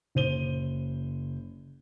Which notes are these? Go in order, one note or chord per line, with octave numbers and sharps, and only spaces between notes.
F#1 C5 D#7 G7